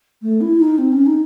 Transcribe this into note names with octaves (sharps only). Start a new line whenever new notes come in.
A3
E4
D#4
C4
C#4
D#4